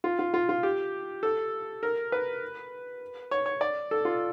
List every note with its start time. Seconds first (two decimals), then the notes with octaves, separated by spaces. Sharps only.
0.04 F4
0.19 F4
0.34 F4
0.49 F4
0.63 G4
1.23 A4
1.83 A#4
2.12 B4
3.31 C#5
3.46 C#5
3.61 D5
3.91 A4
4.05 F4